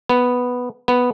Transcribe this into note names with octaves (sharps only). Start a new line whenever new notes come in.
B3
B3